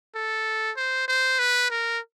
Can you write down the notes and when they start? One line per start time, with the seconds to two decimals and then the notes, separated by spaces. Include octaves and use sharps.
0.15 A4
0.77 C5
1.08 C5
1.39 B4
1.71 A#4